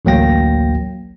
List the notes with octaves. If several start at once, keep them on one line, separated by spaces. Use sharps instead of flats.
A1 D2 F#3 A#3 G5 A#6